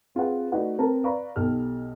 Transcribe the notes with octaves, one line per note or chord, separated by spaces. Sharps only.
C4 F4 G#4 B4 F#5
A3 D#4 F#4 B4 D5 F#5
C4 A#4 B4 A5 A#5
B4 D5 F5 A#5 B5 C#6
B1 D#4 G4 A4 F6